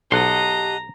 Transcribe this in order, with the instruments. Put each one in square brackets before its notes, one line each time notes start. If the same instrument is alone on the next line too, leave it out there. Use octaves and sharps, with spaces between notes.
[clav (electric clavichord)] B1 [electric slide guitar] G4 A5 [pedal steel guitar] D#5 F#5 C6 [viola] A#5